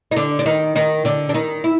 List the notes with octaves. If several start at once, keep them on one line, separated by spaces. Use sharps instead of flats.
D#4
D3 D4
D4
D#3 D#4
D#3 D#4
D3 D4
D4
D#3 D#4
E4